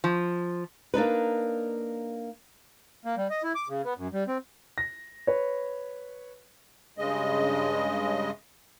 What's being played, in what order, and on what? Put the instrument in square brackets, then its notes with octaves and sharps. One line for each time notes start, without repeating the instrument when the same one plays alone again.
[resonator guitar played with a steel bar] F3
[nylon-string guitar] A#3 D4 D#4 B4
[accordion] A#3
G3
D#5
E4
D6
C#3
B3
F#2
G3
C4
[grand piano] A#6
B4 C#5
[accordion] G2 C#3 G#3 D#5